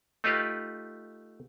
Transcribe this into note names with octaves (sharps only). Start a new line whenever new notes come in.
A3 D#4 F4 G4 B4